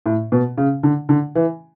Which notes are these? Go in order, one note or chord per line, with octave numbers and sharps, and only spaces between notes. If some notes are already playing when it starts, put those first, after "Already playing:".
A2
B2
C#3
D3
D3
E3